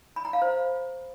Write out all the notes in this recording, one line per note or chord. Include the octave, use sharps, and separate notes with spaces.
B5
A#5
F5
C5